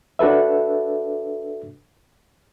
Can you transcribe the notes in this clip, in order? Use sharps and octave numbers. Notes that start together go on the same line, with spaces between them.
D4 F#4 A4 B4 E5